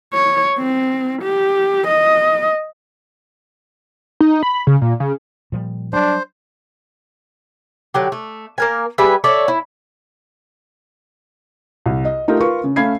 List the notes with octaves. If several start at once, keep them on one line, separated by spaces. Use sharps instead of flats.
C#5
C4
G4
D#5
D#4
B5
C#3
A#2
C#3
A#2 F3 G3
F#3 G3 D4 C5
D3 F#3 G4
A3
A#3 A#4 G#5
G3 G#4 B4 E5
A4 C#5 D5 E5
E4
C2
D#5
A3 D#4 F4 G4 A#4
F4 A#4 B4 C#6
C#3
A3 C#4 F5 B5 G#6 C7